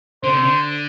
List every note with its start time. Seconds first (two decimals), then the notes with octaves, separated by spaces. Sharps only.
0.23 D3 C5
0.33 C3
0.42 D3